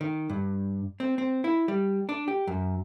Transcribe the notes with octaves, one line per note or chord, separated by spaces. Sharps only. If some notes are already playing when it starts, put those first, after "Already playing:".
D#3
G2
C4
C4
E4
G3
D4
G4
F#2